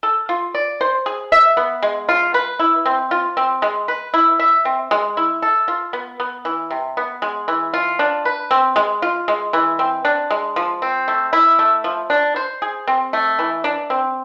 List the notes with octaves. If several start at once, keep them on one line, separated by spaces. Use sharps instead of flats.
A4
F4
D5
C5
G#4
E5
B3
G#3
F4
B4
E4
C4
F4
C4
G#3
B4
E4
E5
C4
G#3
E4
A4
F4
B3
B3
E3
C3
B3
G#3
E3
F4
D4
B4
C4
G#3
F4
G#3
E3
C4
D4
G#3
F3
C4
A3
E4
A3
F3
D4
C5
G#4
C4
A3
E3
D4
C4